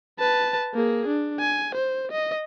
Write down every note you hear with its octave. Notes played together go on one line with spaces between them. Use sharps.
B4 A5
A#3 G#4
D4
G#5
C5
D#5